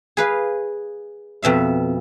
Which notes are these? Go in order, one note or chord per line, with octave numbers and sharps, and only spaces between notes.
G#4 B4 F5
F2 B2 E5 F5